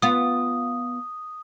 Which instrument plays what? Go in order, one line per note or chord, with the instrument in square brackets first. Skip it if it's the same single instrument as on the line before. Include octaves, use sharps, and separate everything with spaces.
[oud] B3 F4 [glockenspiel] D#6